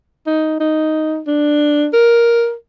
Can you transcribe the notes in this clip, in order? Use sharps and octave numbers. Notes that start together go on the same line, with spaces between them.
D#4
D#4
D4
A#4